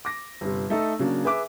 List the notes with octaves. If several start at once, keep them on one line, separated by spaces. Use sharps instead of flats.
D6 A#6
G1 C3
A3 D#4 A4
C#3 F#3 A#3 D4
G#4 B4 E5 D6